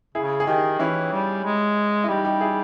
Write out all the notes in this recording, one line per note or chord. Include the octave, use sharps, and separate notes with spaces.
C#3 E4 G#4
G#4
D#3 D#4 G4
E3 C#4 E4
G3
G#3
E4
G3 D#4 G4
D#4 G4
E4 G#4